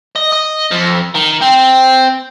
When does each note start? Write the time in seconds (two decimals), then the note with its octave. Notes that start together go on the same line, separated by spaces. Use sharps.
0.16 D#5
0.32 D#5
0.71 F2
1.15 D#3
1.41 C4